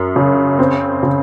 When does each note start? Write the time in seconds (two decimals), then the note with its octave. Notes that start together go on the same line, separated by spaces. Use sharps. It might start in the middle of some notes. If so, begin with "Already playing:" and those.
Already playing: F#2
0.16 C#3
0.59 C4
1.03 C#3